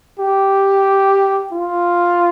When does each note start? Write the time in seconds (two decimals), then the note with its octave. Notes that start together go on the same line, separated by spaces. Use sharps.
0.19 G4
1.52 F4